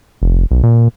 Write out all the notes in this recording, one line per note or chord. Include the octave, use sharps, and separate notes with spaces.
F1
B1
A#2